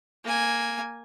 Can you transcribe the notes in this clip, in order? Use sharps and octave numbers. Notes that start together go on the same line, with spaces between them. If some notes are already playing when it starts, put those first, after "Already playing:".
A#3 G#5